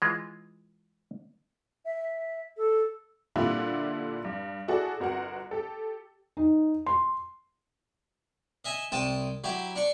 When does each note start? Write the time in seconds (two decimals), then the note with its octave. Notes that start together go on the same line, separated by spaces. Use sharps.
0.02 E3 G#3 F4
1.85 E5
2.57 A4
3.36 A#2 D3 G3 D4 E4 F4
4.24 G2
4.68 E4 F#4 G#4 A4 D5
5.00 G1 F#4 A#4 F#5
5.51 G4 A4
6.37 D#4
6.86 C6
8.65 D#5 E5 G#5
8.92 C2 G5 A5 D#6
9.44 F#3 E4 G4
9.76 D4 C#6